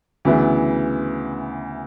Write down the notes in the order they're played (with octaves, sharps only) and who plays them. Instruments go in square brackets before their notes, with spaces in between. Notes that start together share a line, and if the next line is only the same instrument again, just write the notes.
[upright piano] D2 C#3 E3 B3 E4